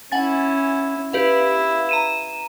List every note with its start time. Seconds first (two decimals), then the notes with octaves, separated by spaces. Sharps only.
0.12 C#4 E4 F#5 G#5 A6
1.13 E4 G4 B4 F5
1.89 A#5 D#7 E7